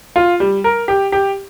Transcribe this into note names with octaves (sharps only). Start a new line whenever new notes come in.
F4
G3
A#4
G4
G4